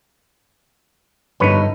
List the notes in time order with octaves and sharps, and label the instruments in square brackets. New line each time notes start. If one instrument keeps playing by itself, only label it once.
[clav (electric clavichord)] G1 B4 C#5 [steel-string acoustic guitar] G2 D#4